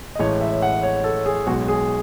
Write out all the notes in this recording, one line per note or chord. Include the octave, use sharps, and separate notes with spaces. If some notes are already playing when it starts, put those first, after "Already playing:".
D#5
A1 A2 G#3 C#5
E5
F#5
C#5
A4
G#4
B1 B2 G#3 F#4
G#4